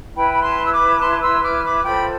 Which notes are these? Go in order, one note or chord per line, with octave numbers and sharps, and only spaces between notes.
E4 B4 G5 B5
B5
A5 C6
E6
B5 D6
A5 C6
C6 E6
D6 F6
B5 D6
F4 A4 C5 G5 B5